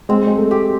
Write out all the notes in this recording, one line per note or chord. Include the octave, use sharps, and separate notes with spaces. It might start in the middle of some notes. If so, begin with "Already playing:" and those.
G#3 C4
G#3
A3
G4